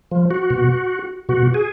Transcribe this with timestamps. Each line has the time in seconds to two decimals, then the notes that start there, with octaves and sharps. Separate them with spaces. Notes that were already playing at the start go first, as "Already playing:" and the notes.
0.11 F3
0.31 F#4
0.50 B2
1.29 B2 F#4
1.54 G#4